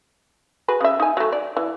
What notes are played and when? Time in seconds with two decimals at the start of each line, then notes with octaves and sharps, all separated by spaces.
0.68 F#4 G#4 B4
0.81 C#3 E5
1.00 D#4 G#5
1.17 F#3 A3
1.32 D5
1.57 E3